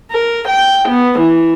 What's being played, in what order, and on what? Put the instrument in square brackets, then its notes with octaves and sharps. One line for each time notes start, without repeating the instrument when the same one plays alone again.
[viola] A#4
G5
B3
E3